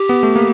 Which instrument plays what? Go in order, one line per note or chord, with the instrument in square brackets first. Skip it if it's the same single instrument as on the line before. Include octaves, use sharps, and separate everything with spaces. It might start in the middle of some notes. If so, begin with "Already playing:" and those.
Already playing: [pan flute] G4
[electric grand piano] B3
A3
A#3